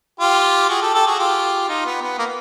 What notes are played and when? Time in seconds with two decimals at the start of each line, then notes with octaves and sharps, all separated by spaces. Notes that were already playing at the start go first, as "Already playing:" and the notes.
0.20 F4 G4
0.69 F#4 G#4
0.82 G4 A4
0.94 G4 A4
1.07 F#4 G#4
1.19 F4 G4
1.69 D#4 F4
1.85 B3
2.01 B3
2.19 A#3